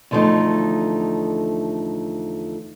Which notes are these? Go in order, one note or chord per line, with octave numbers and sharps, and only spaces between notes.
E2 D3 F3 G3 A3 D#4